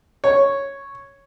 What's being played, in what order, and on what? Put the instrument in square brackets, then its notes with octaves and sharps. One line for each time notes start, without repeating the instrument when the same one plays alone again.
[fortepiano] C#5